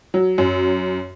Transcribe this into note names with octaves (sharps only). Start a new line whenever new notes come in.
F#3
F#2